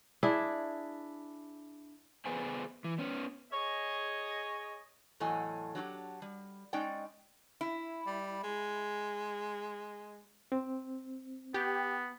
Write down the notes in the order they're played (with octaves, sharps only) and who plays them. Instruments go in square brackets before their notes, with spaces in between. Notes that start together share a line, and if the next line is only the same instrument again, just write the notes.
[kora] D4 E4 G#4
[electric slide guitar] B3 G#4 B4 C5 G#5
E3
B3 C#4
[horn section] G#4 C#5 D#5
[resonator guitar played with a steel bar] E2 A2 F#3 A4 D#5 G#5
F#3 D4 F#4 G4
G3
G#3 C#4 D#4 D5 G5
E4
[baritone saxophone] G3
G#3
[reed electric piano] C4
[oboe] B3 [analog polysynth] G4